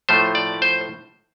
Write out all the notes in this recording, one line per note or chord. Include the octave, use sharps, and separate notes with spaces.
A2 F3 A3 C5
D5
C5